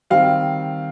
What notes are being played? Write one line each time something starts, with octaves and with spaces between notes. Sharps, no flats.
D#3 G3 C4 F5